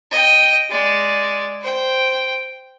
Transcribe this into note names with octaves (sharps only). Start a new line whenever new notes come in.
D#5 G5
G#3 D5
C5 G5